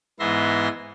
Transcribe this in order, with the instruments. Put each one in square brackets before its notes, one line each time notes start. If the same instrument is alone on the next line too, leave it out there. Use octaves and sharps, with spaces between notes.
[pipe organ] G#2 E3 B3 E5 C6 A#6